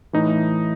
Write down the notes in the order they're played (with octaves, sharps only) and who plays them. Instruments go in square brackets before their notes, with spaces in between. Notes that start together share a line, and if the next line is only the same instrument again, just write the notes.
[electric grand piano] A2 E3 D#4